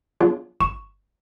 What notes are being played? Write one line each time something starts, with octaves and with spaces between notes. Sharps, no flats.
F#3 B3 D4 F4 G#4 C#5
G1 C#6 E7